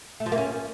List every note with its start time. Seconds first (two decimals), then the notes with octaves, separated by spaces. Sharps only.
0.20 A3
0.26 F3
0.32 A#3
0.38 C#4